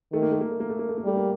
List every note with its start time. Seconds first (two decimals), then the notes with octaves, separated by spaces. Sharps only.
0.13 D#3 A3
0.22 A#3
0.32 A3
0.41 A#3
0.51 A3
0.60 A#3
0.70 A3
0.79 A#3
0.89 A3
0.98 A#3
1.04 G3 A3
1.17 A#3